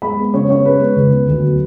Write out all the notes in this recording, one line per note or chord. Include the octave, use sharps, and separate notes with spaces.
G#3 B5
B3
C#3 C#5
C#3 C#5
G#3 B4
B3
C#2
B3
D2
F#3